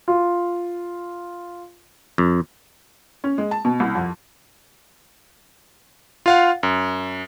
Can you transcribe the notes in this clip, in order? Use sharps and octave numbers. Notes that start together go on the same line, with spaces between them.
F4
F2
C#4
G#3
A5
B2
C2
F2
F4 F5 F#5
F#2